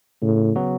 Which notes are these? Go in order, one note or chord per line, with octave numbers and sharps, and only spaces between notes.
A2 C#3
F#3 B3 F#4